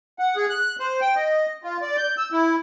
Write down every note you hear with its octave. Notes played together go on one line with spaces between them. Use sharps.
F#5
G#4
F#6
C5
G5
D#5
F4
D5
G6
E6
E4